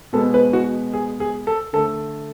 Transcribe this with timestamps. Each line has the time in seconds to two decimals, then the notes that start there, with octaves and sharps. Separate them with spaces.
0.13 B2 G#3 B3 A4
0.34 B4
0.53 F#4
0.94 G#4
1.20 G#4
1.47 A4
1.73 D3 A3 A4